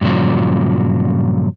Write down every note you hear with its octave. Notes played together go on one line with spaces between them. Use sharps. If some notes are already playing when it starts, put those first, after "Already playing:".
G2 A#2 C#3 F3 F#3